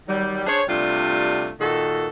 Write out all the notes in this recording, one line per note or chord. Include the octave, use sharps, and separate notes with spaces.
D#3 F#3 G3
D4 G#4 C5 C#5
C3 G3 A3 D4 F4
A#2 D#3 F#4 A4